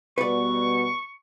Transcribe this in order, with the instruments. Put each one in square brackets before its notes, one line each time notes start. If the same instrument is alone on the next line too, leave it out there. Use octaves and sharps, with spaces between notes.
[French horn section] B2 G3 [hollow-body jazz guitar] B4 D5 [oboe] C#6